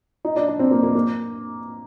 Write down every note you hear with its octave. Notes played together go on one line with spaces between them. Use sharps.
D#4
D4
D4
C4
A#3
A#3
A#3